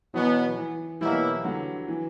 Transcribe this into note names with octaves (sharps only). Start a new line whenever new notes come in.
B2 E3 F#3 B3
E3
B2 E3 F#3 G3 A#3 E4
D3 F#3
E3